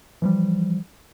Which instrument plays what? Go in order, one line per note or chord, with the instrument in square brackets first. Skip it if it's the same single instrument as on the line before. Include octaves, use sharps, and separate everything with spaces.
[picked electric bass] E3 F3 G3